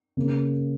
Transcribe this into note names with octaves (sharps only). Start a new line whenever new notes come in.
C#3 A#3 C#4